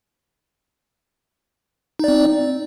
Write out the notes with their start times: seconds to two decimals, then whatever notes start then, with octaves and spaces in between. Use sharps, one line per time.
1.99 D#4
2.04 D5
2.08 C4